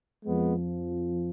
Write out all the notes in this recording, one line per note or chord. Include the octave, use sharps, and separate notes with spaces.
F2 F3 G#3 B3